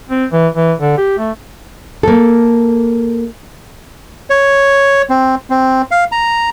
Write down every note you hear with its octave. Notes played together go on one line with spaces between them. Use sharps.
C4
E3
E3
D3
G4
A3
A#3 A4
C#5
C4
C4
F5
A#5